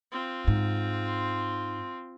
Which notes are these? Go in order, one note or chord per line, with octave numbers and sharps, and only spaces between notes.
C4 F4
G#2